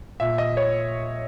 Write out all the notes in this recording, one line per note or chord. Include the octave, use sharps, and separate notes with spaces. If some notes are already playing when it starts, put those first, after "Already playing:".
A#2 E5
D#5
C#5